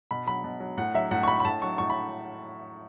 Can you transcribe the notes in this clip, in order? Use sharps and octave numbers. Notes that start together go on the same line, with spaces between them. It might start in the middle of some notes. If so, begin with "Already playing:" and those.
B2 B5
F#3 B5
B2
F#3
A2 F#5
F#3 E5
A2 F#5
C#6
F#3 B5
B5
A2 A5
F#3 C#6
A2 C#6
B5